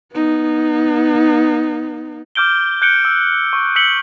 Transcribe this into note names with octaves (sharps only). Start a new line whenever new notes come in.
B3 D#4
D6 F6 G6 D7 G7
F#6 G6 C#7 D7 G7
E6
C#6
E6 B6 C#7 F#7 G7